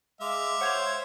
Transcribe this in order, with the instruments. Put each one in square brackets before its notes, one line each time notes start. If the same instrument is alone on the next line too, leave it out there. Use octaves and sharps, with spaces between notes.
[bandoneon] G#3 [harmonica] E5 F5 [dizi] D6
[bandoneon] C5 C#5 [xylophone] F#5 G#6 F7